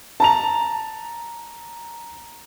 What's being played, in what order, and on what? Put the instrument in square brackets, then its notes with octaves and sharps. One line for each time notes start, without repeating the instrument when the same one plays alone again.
[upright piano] A5 A#5 F7